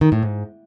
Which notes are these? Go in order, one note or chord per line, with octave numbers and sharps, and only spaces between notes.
D#3
A2
G#2